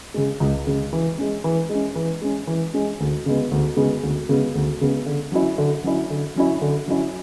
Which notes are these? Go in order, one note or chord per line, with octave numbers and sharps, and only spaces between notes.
C#3 G#3
C#2
C#3 G#3
E3
G#3 C#4
E3
G#3
C#4
E3
G#3 C#4
E3
G#3 C#4
D2
C#3 G#3 B3
D2
C#3 G#3 B3
D2
C#3 G#3 B3
D2
C#3 G#3 B3
D3
F#3 C#4 E4
D3
F#3 C#4 E4
D3
F#3 C#4 E4
D3
F#3 C#4 E4